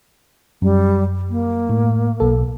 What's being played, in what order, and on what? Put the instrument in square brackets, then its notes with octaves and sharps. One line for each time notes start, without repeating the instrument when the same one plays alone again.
[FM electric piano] F#2 [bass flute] G3
[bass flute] A#3
[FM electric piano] A2
B1 A4